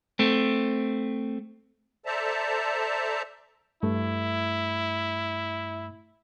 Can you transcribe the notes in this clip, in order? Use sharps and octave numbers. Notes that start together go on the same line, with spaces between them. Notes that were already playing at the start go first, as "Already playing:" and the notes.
A3 C4
A4 C5 D5 E5 A5 A#5
G2 A3 E4